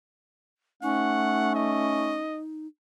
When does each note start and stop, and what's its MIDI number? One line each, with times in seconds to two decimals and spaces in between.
0.82 2.20 57
0.82 2.25 61
0.82 2.67 63
0.82 1.52 78
1.55 2.40 75